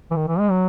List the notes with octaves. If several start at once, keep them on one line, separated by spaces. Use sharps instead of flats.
E3
D#3
E3
G#3
F#3